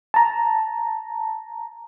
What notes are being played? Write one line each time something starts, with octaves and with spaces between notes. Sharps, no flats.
A5 A#5